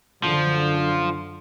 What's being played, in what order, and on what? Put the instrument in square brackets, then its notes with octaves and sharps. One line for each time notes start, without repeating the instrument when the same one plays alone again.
[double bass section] F#2 D3 [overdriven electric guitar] F3